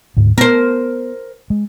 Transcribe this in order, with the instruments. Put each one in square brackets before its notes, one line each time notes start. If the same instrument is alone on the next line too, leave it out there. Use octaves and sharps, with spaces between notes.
[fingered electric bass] D2 G#2
[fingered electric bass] B3 [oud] A#4 C5
[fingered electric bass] G#3